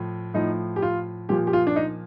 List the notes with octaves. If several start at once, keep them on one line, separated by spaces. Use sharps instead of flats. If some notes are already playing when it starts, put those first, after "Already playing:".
Already playing: A2 F3
A2 F3 D#4
G4
F4
A#2 F3 G4
G4
F4
D4
D#4